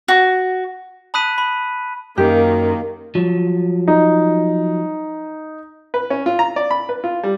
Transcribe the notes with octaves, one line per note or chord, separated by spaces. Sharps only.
F#4
A5 B5 D#6 F#6 B6 D#7
B5
F#2 D#3 A#3 G4
F3 F#3
D#4
B4
C#4
F4
A#5
D5
B5
B4
F4
G3